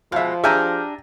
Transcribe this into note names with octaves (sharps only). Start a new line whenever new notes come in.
B2 F3 G#3 E5 F5
D4 G4 G#4 E5 G#5 A#5 F6 G6